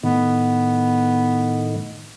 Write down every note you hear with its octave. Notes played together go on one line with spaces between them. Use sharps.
A2 D#3 B3